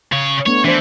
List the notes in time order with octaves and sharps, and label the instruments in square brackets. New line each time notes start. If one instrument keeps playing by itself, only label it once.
[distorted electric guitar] C#3 C#5
[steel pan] A3 B3 D4 [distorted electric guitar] C#5
[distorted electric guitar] E3 [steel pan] D4 C5